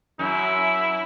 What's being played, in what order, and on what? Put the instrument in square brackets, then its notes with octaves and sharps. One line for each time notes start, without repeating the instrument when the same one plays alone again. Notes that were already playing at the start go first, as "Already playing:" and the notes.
[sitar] F#2 [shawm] E4